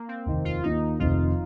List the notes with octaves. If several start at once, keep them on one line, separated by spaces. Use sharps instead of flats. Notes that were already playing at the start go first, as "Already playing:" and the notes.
Already playing: A#3
C4
F1 D#2 D#3
F4
D#2 D#3 A#3 D#4 F4
F1 F2 D#3 F4